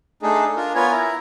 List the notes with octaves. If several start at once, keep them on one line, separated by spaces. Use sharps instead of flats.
A3 D4 D#4 G#4 A4
D4 F4 A#4
B3 F4 A#4 B4 C#5 G#5
E4 E5 A#5